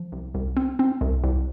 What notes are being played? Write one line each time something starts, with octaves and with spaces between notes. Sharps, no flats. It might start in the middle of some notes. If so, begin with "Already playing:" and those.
Already playing: F3
C2
C2
C4
C4
C2
C2